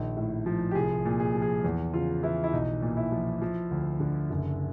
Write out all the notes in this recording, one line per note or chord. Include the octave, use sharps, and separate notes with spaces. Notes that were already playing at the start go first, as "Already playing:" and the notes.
Already playing: A#1 D#3
A2
F3
G4
C2 G#4
A#2
G#4
F3
G#4
E2
C#3 F4
E3 E4
E4
B1 D#4
A#2
E4
F3
F3
D2
D3
F#1